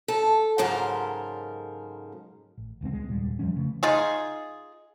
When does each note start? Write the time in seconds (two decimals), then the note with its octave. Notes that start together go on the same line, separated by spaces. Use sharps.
0.08 A4
0.58 G#2 C#3 F#3 A4 A#4 C5
2.57 A1
2.81 D#1 C#2 G#3 C4
2.93 G#3
3.09 F1 D#2 A#2 G3
3.39 F2 F3 G3 C#4
3.56 C#3 A3
3.83 D#4 F4 G#4